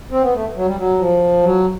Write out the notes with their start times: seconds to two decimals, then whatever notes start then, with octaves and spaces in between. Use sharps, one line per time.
0.11 C4
0.22 B3
0.34 A3
0.56 F#3
0.66 G3
0.77 F#3
0.99 F3
1.43 F#3